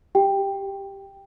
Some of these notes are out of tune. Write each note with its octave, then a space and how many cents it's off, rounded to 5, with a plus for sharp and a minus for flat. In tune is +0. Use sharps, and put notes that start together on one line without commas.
G4 +0 G5 +10